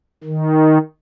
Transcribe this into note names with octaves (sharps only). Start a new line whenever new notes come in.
D#3